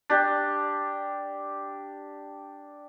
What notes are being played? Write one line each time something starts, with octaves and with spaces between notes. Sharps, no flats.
D4 G4